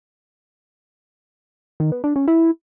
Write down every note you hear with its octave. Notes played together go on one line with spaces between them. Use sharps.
D#3
B3
D4
C#4
E4